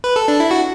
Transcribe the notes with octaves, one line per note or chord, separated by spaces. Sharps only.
B4
A4
D4
E4
F#4